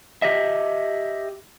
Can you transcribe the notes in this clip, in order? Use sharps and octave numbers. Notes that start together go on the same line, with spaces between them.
G4 D#5 E5